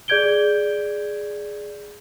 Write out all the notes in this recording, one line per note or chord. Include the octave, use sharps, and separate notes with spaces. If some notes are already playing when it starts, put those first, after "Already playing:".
G#4 D5 G6 G#6 D7 G7